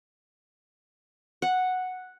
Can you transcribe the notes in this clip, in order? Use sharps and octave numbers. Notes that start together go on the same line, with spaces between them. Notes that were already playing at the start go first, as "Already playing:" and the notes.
F#5